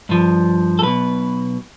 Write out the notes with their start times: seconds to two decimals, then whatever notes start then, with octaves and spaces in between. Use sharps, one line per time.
0.09 G2 F3
0.79 A4
0.83 B1 B2 B4